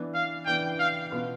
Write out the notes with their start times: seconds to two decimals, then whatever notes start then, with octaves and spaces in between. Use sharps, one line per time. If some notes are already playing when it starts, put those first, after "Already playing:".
Already playing: E3 B3 D4
0.14 F5
0.46 E3 B3 D4 G5
0.79 F5
1.10 B2 B3 F4 B4